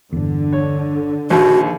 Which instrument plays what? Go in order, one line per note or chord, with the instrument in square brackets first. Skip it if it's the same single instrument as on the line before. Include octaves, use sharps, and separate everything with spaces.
[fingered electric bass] G1 E2 [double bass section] D3
[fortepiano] C#5
[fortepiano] A#1 D#2 [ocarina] F#4